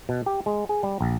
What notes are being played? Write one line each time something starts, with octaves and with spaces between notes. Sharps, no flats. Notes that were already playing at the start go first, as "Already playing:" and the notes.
B2
G4
G#3
G#4
G3
A#1